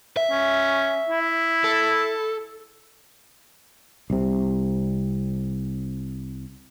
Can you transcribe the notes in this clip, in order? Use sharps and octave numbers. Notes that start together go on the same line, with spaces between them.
E5
C#4
E4
A4
C2 C3